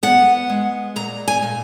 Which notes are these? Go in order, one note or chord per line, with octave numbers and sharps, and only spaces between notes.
B3 F#5
G#3
A#2 A#5
G#5
A#2